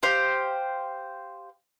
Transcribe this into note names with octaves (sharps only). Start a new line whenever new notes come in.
G4 C5 F5